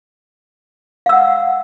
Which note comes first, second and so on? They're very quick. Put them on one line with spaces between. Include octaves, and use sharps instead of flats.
F5 E6 F#5